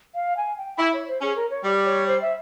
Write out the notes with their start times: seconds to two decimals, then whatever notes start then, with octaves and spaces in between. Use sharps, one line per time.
0.15 F5
0.37 G#5
0.58 G5
0.79 E4 E5
0.93 C#5
1.08 C5
1.21 C#4 G#4
1.36 A#4
1.50 C#5
1.64 G3
1.85 C#5
2.08 C5
2.22 E5